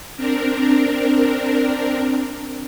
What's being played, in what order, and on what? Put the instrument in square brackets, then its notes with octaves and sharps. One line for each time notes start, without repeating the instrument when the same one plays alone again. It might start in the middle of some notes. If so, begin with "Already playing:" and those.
[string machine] C4 D4 A#4